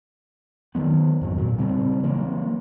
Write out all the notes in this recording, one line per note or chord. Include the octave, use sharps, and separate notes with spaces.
D#3 E3 F#3 B3
F2 G#2 F#3
A#2
C#3 G3 C4
E3 F#3 A#3